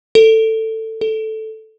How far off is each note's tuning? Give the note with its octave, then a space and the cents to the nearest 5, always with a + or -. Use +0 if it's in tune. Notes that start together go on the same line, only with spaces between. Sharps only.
A4 +15
A4 -5